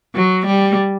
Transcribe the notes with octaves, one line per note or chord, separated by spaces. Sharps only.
F#3
G3